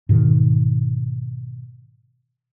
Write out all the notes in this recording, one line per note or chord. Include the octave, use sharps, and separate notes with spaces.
G#2 B2 D#3